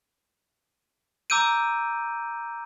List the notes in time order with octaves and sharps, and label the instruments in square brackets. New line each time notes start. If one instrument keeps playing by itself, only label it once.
[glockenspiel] A#5 D6 E6 G6 D7 D#7